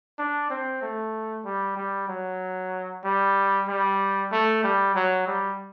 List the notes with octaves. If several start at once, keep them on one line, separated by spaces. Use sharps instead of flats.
D4
C4
A3
G3
G3
F#3
G3
G3
A3
G3
F#3
G3